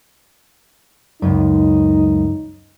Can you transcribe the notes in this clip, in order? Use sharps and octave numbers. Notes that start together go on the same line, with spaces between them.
C#2 F#2 D#4